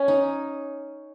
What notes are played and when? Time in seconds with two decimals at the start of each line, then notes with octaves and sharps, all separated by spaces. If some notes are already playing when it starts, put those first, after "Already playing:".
Already playing: C#4
0.08 D#4